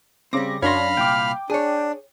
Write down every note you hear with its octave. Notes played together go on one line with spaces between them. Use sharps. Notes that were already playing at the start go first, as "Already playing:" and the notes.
C#3 G3 C4 D6 A#6
F#2 D4 C#5 F5 B5 C6 F6 A#6
C2 A#2 G5 D6
D4 G#4 C#5